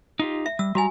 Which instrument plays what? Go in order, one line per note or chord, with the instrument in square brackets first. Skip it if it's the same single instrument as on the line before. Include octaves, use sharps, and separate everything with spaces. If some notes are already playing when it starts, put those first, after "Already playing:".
[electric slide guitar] D#4 F4 G4
[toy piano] E5
[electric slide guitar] G3 [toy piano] E6
[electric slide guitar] G3 A#5 [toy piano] F#4 G#5